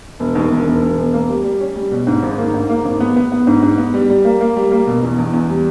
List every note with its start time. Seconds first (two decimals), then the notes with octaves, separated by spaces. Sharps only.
0.20 E1
0.35 D#2
0.51 E1
0.67 E1
0.82 E1
0.97 E1
1.13 A#3
1.29 G3
1.44 G3
1.60 C#4
1.76 G3
1.92 B2
2.07 G#2
2.23 G#1
2.38 A#3
2.54 G#2
2.69 A#3
2.85 G#1
3.00 B3
3.16 B3
3.32 B3
3.47 G#2
3.63 G#2
3.78 B3
3.94 G3
4.10 G3
4.25 A#3
4.41 A#3
4.56 G3
4.71 A#3
4.87 B2
5.03 E2
5.18 E2
5.34 E2
5.50 G3